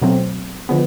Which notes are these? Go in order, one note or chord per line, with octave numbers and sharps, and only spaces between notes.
B2 F#3 A3 C4
D3 F3 G#3 B3